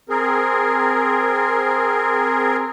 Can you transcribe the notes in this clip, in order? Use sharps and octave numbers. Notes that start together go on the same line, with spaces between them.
C4 G#4 A#4